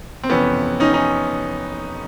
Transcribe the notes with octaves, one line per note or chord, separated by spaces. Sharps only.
C4
F2 C3 E3 B3 C#4
C#4 D#4
C#4 D#4